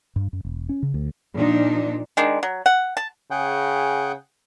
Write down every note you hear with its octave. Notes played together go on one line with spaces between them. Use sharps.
G2
F#2
E1
C#4
C#3
D2
A#2 F3 D4 D#4
D#3 G#3 D4
F#3
F#5
A5
C#3 G#4 F#5 G5